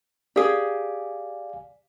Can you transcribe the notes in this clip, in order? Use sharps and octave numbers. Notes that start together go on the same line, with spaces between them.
G4 G#4 D5 F5 G#5